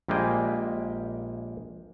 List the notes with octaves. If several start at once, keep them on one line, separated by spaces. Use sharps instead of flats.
A#1 G3 G#3 A#3 G5 G#5